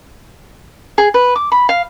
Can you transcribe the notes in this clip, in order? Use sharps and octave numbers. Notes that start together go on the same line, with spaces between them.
G#4
B4
D6
B5
F5